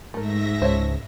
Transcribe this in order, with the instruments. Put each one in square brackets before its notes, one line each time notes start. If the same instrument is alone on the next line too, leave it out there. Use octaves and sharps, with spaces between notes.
[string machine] G#2 E5 A#6 [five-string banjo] A3 A#4
[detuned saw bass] C#2 [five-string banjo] C5 C#5 A5